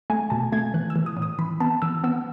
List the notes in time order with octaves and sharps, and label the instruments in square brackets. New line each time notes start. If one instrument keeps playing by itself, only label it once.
[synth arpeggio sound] A3 G#5
B2 A5
A3 G#6
E3 F#6
E6
E3
D#6
A2
D#6
E3 B5
B3 A5
E3 E6
B3 E6